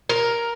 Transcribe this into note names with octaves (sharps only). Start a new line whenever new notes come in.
A#4